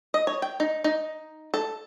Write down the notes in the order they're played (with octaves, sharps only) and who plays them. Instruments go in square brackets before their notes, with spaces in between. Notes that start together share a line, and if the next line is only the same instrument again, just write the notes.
[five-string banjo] D#5
C#5
G5
D#4
D#4
A4